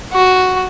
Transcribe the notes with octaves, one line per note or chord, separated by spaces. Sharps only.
F#4